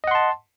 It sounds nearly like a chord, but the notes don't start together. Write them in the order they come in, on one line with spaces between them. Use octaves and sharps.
D#5 F#5 C6 A5